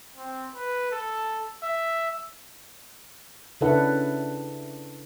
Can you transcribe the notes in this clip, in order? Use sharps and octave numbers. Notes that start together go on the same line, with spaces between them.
C4
B4
A4
E5
C#3 D4 E4 A4 B4 F#5